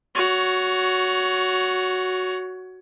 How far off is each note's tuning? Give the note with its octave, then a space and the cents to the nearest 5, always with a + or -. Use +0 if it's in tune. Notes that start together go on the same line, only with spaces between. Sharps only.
F#4 +0 C#5 +20